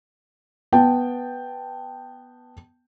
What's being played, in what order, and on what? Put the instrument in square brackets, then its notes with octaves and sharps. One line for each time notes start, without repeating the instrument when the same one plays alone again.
[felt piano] B3 G5 A5